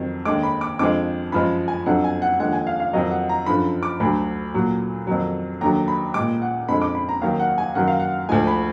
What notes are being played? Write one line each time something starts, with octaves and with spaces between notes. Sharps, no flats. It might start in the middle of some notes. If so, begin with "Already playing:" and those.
Already playing: F2 D#3 F#3
D#2 D3 G#3 D6
B5
D6
F2 D3 F3 G#3 D6
F#2 F3 G#3 B5
G#5
F2 D3 F#3 F#5
G#5
F#5
D#2 D3 F3 G#3 F#5
G#5
F5
F5
F2 D#3 F#3 D#5
F#5
A#5
F#2 D3 F3 B5
D6
D2 D3 F#3 B5
A#2 F#3
F2 D#3 F#3
D#2 D3 F#3 A#5
B5
A#2 G#3 D6
F#5
F2 D3 G#3 B5
D6
B5
A#5
D#2 D#3 F#3 F5
F#5
G#5
F#2 D#3 F#3 F#5
F5
F#5
D2 D3 F3 G#3 G#5
B5